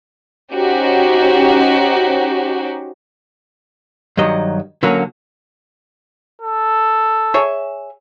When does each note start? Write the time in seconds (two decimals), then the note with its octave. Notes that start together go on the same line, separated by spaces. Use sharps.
0.53 C#4 D#4 F#4 G4 C5
4.17 G2 D#3 F#3 D#5
4.83 D3 F#3 A#3 C#4
6.42 A4
7.34 G#4 C#5 E5